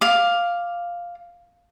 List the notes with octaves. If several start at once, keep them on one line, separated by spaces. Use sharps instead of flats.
F5 D6